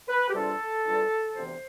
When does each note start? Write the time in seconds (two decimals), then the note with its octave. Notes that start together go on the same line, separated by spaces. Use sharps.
0.08 B4
0.30 G4
0.34 E2 C3 G3 D4 F4 A4
0.85 E2 D3 G3 D4 F4
1.36 D2 C3 E3 B3 C5